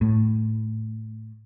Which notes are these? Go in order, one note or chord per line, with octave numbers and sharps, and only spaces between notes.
A2